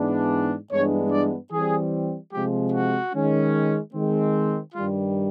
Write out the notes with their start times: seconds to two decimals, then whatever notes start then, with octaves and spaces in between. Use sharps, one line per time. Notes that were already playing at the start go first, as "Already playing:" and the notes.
Already playing: G#2 E3 G#3 B3 D4
0.71 G2 E3 G#3 B3 D4 C#5
1.11 D5
1.52 E3 G3 C4 G#4
2.32 C3 F3 G#3 G4
2.73 F#4
3.13 D#3 G#3 C#4
3.94 D#3 G#3 C4
4.74 G2 D#3 G3 F4